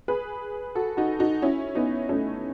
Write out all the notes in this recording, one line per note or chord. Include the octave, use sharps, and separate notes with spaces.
G#4 B4
F#4 A4
D#4 F#4
D#4 F#4
C#4 E4
B3 D#4
A3 C#4